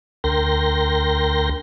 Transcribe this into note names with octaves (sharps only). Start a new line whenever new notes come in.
D2 A#4 G5 C6 A#6